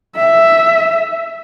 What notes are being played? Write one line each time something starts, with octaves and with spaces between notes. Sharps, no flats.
E5